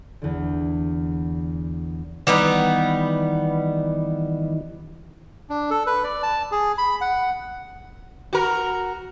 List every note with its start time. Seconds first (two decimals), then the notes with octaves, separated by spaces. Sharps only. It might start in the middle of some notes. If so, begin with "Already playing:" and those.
0.22 E2 D3
2.27 D#3 E3 G3 B3 D#4
5.50 D4
5.71 A4
5.87 B4
6.04 D5
6.23 A5
6.52 G#4
6.78 B5
7.01 F#5
8.33 F#4 A#4